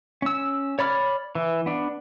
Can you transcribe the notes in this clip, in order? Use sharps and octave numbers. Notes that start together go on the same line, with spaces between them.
C#4 E6
C#5 D5 B5 D6 F6
E3
B3 D4